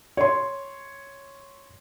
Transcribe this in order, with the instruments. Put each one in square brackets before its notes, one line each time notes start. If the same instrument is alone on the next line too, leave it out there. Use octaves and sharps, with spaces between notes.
[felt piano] C#5 C6